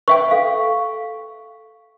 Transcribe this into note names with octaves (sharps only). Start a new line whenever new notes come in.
B4 E5 G5 C#6
A4 F5